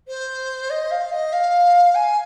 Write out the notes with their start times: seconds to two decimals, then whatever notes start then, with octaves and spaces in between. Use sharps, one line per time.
0.08 C5
0.70 D#5
0.91 F5
1.12 D#5
1.33 F5
1.95 G#5